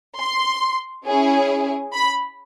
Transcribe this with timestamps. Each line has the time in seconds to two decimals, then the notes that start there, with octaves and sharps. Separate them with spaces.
0.19 C6
1.07 C#4 E4 G#4
1.95 B5